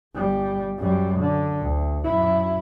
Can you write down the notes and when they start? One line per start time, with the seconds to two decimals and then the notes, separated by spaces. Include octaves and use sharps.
0.15 G1 G3
0.78 F#2 G3
1.19 D3
1.62 D2
2.04 F#2 E4